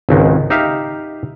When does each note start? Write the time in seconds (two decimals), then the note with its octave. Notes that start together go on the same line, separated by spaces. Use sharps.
0.09 G#1 C#2 D#3
0.50 D#4 G4 E5 F5